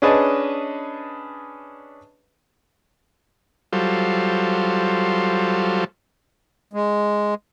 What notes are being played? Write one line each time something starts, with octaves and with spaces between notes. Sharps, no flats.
C#4 D4 G#4 B4 D#5 A5
F#3 G3 F4 A4 C5
G#3